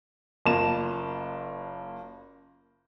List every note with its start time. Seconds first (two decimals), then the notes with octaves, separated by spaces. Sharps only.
0.46 F#1 A#3 F4 A5 E7